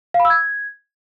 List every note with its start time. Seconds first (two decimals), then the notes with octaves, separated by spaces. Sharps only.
0.14 F5
0.20 B5
0.25 E6
0.30 G#6